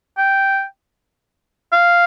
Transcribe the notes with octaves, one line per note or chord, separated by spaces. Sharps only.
G5
F5